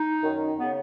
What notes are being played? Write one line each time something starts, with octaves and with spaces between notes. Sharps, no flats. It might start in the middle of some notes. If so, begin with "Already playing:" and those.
Already playing: D#4
F#2 D#3
C#3 B3